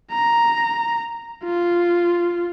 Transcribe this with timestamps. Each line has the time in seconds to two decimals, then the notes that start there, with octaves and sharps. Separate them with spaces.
0.12 A#5
1.44 F4